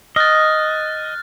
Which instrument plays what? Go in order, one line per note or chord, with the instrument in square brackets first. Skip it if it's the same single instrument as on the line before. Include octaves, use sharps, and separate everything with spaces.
[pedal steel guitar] D#5 [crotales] F6 F#6 A6